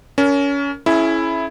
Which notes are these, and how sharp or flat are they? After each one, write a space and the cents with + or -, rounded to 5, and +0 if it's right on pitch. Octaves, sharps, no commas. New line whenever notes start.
C#4 +25 A#4 +0
C#4 -10 E4 +0 G#4 +45